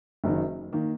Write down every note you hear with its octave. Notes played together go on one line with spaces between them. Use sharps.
F#1 F#2 D#3
D#3 A#3